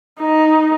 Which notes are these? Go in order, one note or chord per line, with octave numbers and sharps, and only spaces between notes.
D#4